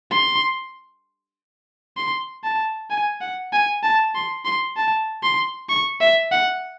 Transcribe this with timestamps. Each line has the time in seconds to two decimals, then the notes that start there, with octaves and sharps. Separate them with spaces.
0.11 C6
1.97 C6
2.44 A5
2.90 G#5
3.21 F#5
3.52 G#5
3.83 A5
4.14 C6
4.45 C6
4.77 A5
5.23 C6
5.69 C#6
6.00 E5
6.31 F#5